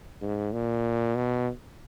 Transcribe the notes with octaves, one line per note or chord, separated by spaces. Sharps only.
G#2
A#2
B2